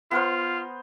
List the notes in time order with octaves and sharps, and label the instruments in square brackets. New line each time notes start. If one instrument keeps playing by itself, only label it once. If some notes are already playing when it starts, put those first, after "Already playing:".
[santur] B3 A#4 C5 [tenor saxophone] F4